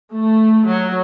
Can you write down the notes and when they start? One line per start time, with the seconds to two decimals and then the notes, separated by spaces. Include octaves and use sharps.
0.13 A3
0.67 F#3